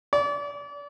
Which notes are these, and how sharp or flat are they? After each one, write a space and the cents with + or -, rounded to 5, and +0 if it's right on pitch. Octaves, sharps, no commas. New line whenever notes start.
D5 -35